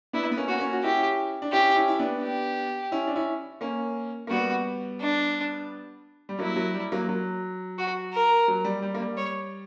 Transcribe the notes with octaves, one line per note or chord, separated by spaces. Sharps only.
B3 D4 E4
B3
A#3 C#4
F#4
A#3 C#4
F#4
C#4 E4 G4
D4
C#4 E4 G4
C#4 E4
E4
B3 D4
G4
C#4 E4
D4
C#4 E4
A#3 C#4
A#3
G3 B3 F#4
D4
G3
F#3 A#3 E4
F#3
G3
F#3 A#3
F#3
F#4
A#4
F#3
G3
G3
A#3
G3
C#5